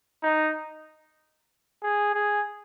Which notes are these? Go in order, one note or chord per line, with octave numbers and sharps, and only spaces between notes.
D#4
G#4
G#4